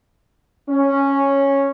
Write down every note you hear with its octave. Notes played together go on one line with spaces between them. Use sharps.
C#4